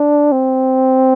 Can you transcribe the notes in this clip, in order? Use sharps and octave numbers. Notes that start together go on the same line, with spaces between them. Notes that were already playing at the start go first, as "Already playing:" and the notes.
Already playing: D4
C4